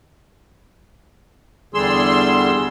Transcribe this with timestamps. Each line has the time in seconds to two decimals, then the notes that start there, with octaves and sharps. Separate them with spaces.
1.74 E2 D3 G3 G#4 C6 E6